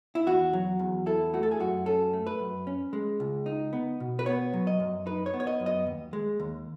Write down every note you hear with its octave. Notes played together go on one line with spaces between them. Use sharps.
E4
E2 F#4
F#3
E2
E4 A4
A3 F#4
A4
G#4
F#2 F#4
C#4 A4
A3
B4
F#2
C#4
G#3
C#2
D#4
B3
B2
B4
B3 C#5
F#3
D#5
F#2
D#4 B4
C#5
B3
C#5
D#5
F#2
D#5
D#2
G#3
D#2